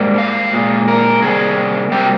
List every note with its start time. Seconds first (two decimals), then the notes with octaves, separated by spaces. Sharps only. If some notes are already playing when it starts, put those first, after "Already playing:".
Already playing: G#2 G3 A#3
0.18 F5
0.54 A#2 G#3
0.88 A#4
1.22 C3 G3 A#3 G#4
1.91 C3 G3 A#3 G4